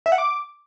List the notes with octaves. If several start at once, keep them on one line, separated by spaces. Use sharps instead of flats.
E5
F#5
D6